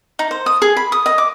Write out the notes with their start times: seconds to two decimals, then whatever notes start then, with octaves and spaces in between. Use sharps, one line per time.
0.19 D#4
0.31 C5
0.46 D#6
0.62 G#4
0.77 B5
0.92 D#6
1.06 D#5
1.18 D6